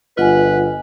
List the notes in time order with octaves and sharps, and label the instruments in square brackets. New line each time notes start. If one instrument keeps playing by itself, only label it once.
[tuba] G1 [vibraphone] F4 F#5 [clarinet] B4 [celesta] D#5 G#5